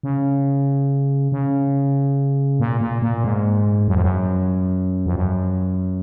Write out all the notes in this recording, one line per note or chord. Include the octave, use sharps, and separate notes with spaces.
C#3
C#3
A#2
A#2
A#2
G#2
F#2
F2
F#2
F2
F#2